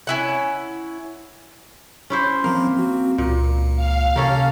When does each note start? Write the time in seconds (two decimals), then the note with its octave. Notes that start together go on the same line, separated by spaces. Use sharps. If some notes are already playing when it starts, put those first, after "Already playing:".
0.07 C#4 E4 F#5
2.10 C#4 E4 C5
2.44 F3 A#3 C4
2.77 C4 F#4
3.18 C#2 A#2
3.76 F5
4.16 C3 A#3 C#4 A4